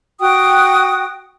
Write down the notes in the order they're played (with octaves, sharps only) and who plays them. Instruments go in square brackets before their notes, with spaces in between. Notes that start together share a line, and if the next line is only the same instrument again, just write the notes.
[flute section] F#4 G5 D#6